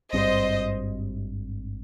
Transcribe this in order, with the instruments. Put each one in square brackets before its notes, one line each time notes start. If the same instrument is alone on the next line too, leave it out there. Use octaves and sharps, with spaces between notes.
[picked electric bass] G#1 G2 G3 C4 [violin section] C5 D#5